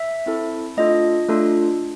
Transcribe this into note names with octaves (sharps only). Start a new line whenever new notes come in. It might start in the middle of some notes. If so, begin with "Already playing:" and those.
Already playing: E5
C4 E4 A4
A3 D4 F4 A4 D#5
A3 D4 F4 A4